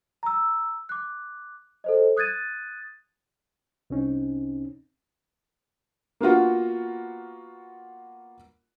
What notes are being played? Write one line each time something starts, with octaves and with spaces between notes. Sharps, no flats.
A#5 E6
D6 F#6
A4 C5 D#5
D#6 F#6 G#6 A6 D#7
C2 C4 C#4 D#4
A#3 B3 F4 F#4